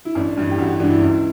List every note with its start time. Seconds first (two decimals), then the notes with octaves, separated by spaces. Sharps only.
0.05 E4
0.15 A1 D4
0.37 G2 E3
0.51 G4
0.58 A1 F#4
0.69 F#4
0.80 G2 E3 D4
0.90 E4
1.01 C#2